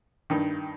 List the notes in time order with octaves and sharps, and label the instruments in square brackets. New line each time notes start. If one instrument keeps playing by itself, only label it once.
[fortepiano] G2 D#3